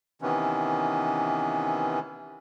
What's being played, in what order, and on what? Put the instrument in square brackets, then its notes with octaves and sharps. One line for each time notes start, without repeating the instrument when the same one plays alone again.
[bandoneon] C3 D#3 E3 B3 C#4